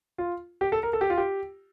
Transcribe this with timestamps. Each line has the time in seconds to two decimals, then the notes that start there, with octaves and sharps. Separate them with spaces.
0.18 F4
0.61 G4
0.72 A4
0.83 A#4
0.93 A4
1.01 G4
1.10 F4
1.17 G4